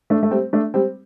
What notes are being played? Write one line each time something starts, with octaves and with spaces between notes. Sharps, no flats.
A3 D4
A3
G3 C4
A3 D4
G3 C4